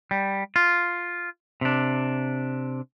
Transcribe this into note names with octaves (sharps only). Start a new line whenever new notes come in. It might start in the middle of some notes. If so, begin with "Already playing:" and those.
G3
F4
C3 D4